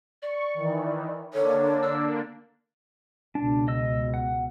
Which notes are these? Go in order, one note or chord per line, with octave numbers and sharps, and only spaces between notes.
D5 C#6
D#3 E3
D3 A#3 D4 A4 C#5
E6
C#2 B2 D4
D#5 E6
F#5